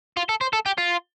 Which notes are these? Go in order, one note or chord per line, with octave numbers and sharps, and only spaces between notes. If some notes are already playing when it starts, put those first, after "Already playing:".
F4
A4
C5
A4
G4
F4